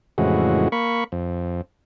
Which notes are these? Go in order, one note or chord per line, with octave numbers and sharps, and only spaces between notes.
F2 A2 C#3 E3 G#3 F#4
A#3 B5 C#6
F2